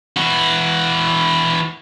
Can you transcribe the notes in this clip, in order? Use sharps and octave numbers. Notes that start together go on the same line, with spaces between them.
E3 F#4